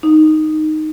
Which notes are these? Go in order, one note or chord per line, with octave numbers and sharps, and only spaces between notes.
D#4